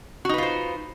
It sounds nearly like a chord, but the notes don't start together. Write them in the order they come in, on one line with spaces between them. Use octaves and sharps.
F#4 D#4 B4 F4 C5